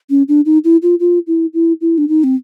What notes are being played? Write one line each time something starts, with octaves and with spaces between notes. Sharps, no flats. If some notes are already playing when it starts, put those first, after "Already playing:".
C#4
D4
D#4
E4
F4
F4
E4
E4
E4
D4
D#4
C4